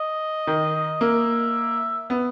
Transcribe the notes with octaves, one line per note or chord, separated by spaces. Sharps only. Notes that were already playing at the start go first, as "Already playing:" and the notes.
Already playing: D#5
D#3
A#3 E5
B3